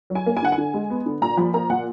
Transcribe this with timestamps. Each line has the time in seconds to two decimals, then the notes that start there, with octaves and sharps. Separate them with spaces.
0.10 F#3
0.15 G#5
0.26 A#3
0.37 G#5
0.42 D3 F#5
0.52 G#5
0.58 D3
0.74 G#3
0.90 B3
1.06 D3
1.22 A#2 A#5
1.37 F3 B5
1.54 A#3 A#5
1.70 A#2 F#5